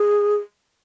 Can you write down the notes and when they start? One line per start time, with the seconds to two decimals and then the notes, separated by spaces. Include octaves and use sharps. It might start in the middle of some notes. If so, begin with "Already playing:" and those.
Already playing: G#4